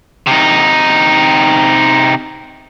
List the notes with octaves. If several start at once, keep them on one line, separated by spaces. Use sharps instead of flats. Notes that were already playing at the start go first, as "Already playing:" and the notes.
C3 D#4